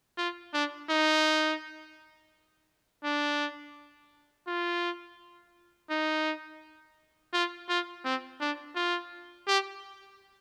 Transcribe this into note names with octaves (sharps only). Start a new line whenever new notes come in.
F4
D4
D#4
D4
F4
D#4
F4
F4
C4
D4
F4
G4